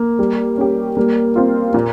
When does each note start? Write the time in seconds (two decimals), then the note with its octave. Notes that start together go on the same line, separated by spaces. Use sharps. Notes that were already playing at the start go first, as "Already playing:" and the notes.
Already playing: A#3
0.19 G3
0.58 C#4 G4
0.97 G3 A#3
1.36 C4 F4
1.74 A#2